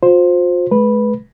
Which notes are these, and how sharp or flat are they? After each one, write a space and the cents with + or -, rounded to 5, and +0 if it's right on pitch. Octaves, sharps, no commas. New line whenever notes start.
F4 +40 C5 +5
G#3 +40 B4 -10